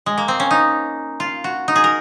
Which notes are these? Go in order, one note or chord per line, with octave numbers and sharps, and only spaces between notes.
G#3
A#3
C4
C#4
D#4
F4
F#4
D#4
G#4
A#4